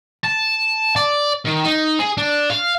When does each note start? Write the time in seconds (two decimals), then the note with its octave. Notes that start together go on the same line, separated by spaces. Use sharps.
0.24 A5
0.96 D5
1.46 D#3
1.66 D#4
2.00 G#4
2.18 D4
2.50 F5